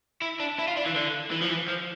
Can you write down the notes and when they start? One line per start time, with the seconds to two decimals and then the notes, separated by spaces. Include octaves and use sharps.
0.22 E4
0.40 D4
0.59 E4
0.68 F4
0.77 D4
0.86 E3
0.95 D3
1.32 E3
1.42 F3
1.50 E3
1.68 F3